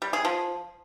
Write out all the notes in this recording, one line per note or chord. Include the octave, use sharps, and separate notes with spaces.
G3
G#4
F3